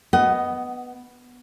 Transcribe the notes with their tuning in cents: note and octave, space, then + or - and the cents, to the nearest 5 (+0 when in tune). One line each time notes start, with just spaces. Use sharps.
B3 +0 D#5 +0 F#5 +25